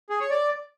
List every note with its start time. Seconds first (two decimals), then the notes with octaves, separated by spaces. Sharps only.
0.10 G#4
0.20 C#5
0.30 D5